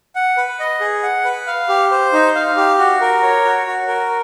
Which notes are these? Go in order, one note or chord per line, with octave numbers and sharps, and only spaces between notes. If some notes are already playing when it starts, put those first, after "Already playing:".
F#5
B4
D#5
G#4
F#5
B4
F5
G4
C5
D#4
F5
G4
F#4
A#4
C#5
F#4
F#4
A#4